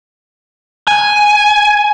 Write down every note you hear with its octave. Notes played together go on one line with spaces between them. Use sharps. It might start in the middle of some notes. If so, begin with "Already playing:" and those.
G#5